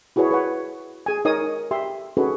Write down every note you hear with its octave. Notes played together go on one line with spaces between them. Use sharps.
E4 F#4 G#4 B4 C#5
B4 C#5 F#5
G#4 G#5
D#4 A#4 C#5 D#5 G#5 D#6
G4 E5 C6
C#4 D#4 F#4 G#4 A4 B4